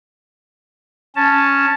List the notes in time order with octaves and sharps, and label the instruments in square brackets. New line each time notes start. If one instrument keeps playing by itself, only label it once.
[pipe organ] C#4 A5